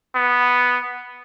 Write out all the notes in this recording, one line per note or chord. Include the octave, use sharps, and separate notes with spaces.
B3